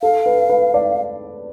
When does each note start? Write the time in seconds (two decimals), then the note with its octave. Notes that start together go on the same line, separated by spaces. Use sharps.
0.02 A4 F5
0.26 B4
0.49 B4
0.74 D5